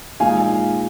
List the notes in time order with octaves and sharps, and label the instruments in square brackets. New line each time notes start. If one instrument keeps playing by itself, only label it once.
[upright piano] A#2 G#3 D#4 F5 G#5